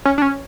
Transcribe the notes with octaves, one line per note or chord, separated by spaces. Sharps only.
C#4
D4
C#4